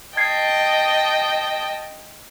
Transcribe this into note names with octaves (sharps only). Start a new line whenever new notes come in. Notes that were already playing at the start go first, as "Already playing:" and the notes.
D#5 G5 A5 G#6 C7